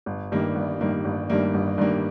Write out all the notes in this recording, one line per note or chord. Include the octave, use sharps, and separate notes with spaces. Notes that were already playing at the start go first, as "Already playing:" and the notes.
G1
G2 D#3 G3 A#3
G1
G2 D#3 G3 A#3
G1
G2 D#3 G3 A#3
G1
G2 D#3 G3 A#3